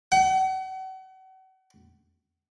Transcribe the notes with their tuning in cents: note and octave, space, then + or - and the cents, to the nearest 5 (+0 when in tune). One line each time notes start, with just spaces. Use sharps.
F#5 +40